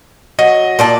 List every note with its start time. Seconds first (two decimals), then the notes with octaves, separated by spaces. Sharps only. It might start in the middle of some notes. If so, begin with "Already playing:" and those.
0.39 F#3 D#5
0.79 A#2 D5 A5